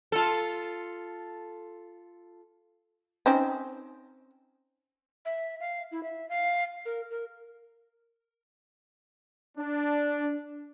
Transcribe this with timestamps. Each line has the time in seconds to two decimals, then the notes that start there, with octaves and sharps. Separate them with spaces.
0.12 F4 A4
3.26 C4 C#4 D#4
5.25 E5
5.60 F5
5.92 E4
6.03 E5
6.29 F5
6.86 A#4
7.11 A#4
9.58 D4